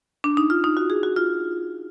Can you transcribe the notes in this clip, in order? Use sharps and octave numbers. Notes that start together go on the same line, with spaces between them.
D4
D#4
F4
D#4
F#4
G#4
F#4
F4